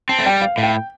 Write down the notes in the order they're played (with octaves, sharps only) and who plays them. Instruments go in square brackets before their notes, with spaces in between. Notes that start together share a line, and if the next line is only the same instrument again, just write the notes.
[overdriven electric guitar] C4 [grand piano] A5
[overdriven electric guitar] A3
[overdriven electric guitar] G3 [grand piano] G5
[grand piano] F5
[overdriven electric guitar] A2
[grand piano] G5